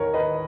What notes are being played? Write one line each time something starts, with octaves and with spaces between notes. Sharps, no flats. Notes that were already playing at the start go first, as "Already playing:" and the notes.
Already playing: D#2 D#3 A#4 C#5
B4 D#5